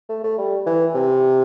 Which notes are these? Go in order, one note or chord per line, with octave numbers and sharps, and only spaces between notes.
A3
A3
G3
E3
C3